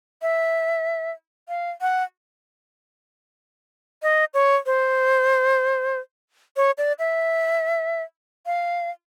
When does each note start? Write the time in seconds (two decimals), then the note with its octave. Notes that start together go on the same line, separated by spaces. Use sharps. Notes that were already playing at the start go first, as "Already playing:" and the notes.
0.22 E5
1.49 F5
1.81 F#5
4.03 D#5
4.34 C#5
4.66 C5
6.56 C#5
6.78 D5
6.99 E5
8.46 F5